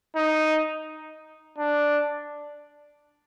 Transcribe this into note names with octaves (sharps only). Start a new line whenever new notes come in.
D#4
D4